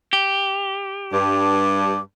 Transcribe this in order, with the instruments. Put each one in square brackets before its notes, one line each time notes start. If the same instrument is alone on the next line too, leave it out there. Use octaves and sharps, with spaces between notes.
[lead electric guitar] G4
[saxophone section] G2 [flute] D6